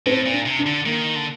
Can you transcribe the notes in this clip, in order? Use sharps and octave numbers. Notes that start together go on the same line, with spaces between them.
A2 C4
A#2
D4
C3
D4
D3
D#3 A#3
D3